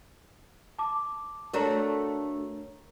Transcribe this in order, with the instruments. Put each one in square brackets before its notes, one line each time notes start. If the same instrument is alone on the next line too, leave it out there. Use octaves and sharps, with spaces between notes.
[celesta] A5 D6
[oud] A3 D4 F#4 [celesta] A#4 C#5 A#5